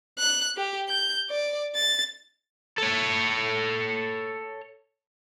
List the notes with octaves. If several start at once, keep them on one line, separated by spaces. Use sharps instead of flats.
F#6
G4
G6
D5
A6
A4 C#5